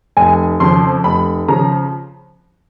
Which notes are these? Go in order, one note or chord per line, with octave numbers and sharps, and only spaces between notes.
F1 G#5
F2 C#3 F3 C6
F1 B5
C#3 F3 A#5